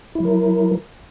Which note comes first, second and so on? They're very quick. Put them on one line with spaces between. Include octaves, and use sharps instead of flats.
E4 F#3 A#4